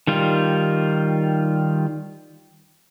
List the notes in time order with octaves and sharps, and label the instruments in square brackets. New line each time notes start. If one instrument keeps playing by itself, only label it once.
[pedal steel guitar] D#3 G3 F4